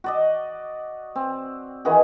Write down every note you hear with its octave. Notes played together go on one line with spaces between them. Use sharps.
F#4 D5 D#5
C4
D#3 E3 F#4 G#4